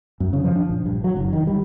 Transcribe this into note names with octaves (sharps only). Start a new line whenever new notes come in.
F#2
C#3
F3
D4
A#1
G2
F#3
F#1
D#3
G3